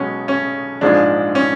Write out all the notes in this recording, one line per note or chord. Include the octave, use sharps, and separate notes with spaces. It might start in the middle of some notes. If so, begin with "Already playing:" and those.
Already playing: B1 B2 G#3 C#4
C#4
A#1 G#2 F3 G#3 D4
C#4